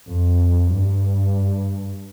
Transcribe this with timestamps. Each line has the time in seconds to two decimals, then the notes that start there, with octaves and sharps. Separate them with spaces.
0.11 F2
0.73 G2